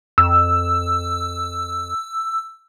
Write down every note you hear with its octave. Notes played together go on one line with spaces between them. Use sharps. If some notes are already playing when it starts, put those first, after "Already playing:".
F2 E6